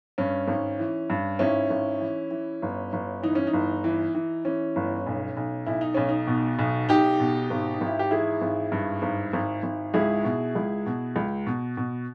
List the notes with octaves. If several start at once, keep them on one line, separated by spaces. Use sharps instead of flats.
G2 C#4
G#1
E3
G2
G#1 C#4 E4
G#1
E3
E3
G1
G1
E3 D#4
C#4
D#4
G1
E3
E3
E3 C#4
G1
B1
B1
B1 E4
D#4
B1 C#4
D#4
B2
B1
B1 D#4 G4
B2
G#1
D#4
G#1
E4
G4
E3 E4 G#4
G#1
G2
G#1
G#1
G#1
C#2 E4 G#4
B2
C#2
B2
C#2
B2
B2